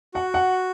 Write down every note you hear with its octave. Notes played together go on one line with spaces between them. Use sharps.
F#4 F#5
F#5